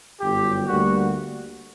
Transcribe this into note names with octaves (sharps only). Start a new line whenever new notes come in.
G1 F#2 F#3 G4
D2 D3 G3 A#3 F#4